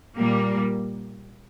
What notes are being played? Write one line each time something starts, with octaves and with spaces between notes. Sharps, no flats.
A#2 G3 A#3